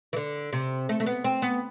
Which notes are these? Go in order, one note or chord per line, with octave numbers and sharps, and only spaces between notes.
E3
D3
C3
A3
A3
B3
C4
B3